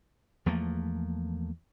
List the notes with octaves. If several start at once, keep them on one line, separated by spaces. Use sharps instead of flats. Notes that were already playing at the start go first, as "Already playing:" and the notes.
E2 F3 A3 A#3